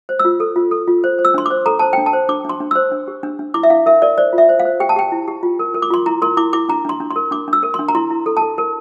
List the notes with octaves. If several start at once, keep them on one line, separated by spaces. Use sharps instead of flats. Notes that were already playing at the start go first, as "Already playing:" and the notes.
C5
E6
F4
A4
F4
A4
F4
C5
C5
E6
D4 C6
C5 D6
A4 A#5
C5 A5
D4 G5
A5
C5
D4 D6
D4 C6
D4
C5 E6
D4
G4
D4
D4
E4 D6
E5
E4 F5
A#4 E5
A#4 D5
C5 D5
F4
E5
C5
F5
C5
G4 G5
A5
G4 G5
E4
G4
F4
A#4
A#4
D6
F4 C6
E4 A#5
A#4 C6
E4 D6
E4 D6
D4 A#5
D4 C6
D4
C6
A#4
D4 D6
D4 E6
A#4
C6
D4
A#5
E4 C6
E4
A4
A4 A5
A#4